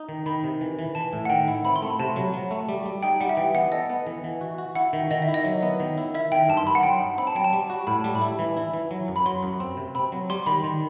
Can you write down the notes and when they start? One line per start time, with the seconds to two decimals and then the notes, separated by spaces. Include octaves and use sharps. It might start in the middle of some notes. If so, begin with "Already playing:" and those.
Already playing: D#4
0.09 D#3
0.26 D#3 B5
0.44 C3
0.61 E3
0.79 E3
0.95 E3 A5
1.13 A2
1.25 F#5
1.30 D#3 G5
1.48 E4
1.65 C4 B5
1.76 C6
1.82 A3 B5
1.99 C3 A5
2.16 F#3
2.34 F#3
2.51 A3
2.69 G3
2.86 G3
3.03 D#4 G5
3.21 G3 F#5
3.29 E5
3.37 E3 G5
3.55 B3 F#5
3.72 A4 D#5
3.90 B3
4.07 E3
4.24 E3
4.41 F#4
4.58 F#4
4.75 E4 F#5
4.93 D#3
5.11 D#3 D#5
5.22 E5
5.28 E4
5.34 D#5
5.45 F#3
5.62 B3
5.80 D#3
5.98 E4
6.14 E4 E5
6.32 D#3 G5
6.49 G2 A5
6.57 C6
6.66 G2 B5
6.75 F#5
6.83 F#3 G5
7.00 D#4
7.18 C4 B5
7.27 A5
7.35 F#3 G5
7.44 A5
7.53 G3
7.70 F#4
7.87 A2 B5
8.01 G3 A5
8.15 B5
8.21 E4
8.39 E3
8.57 E4
8.74 E3
8.91 F#3
9.08 F#2
9.16 B5
9.26 F#3 C6
9.43 F#2
9.60 C4
9.77 C3
9.95 C4 B5
10.12 F#3
10.30 G3 C6
10.46 D#3 B5
10.64 D#3